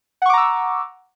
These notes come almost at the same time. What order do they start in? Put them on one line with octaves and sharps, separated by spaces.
F#5 C#6 D6 A#5 E6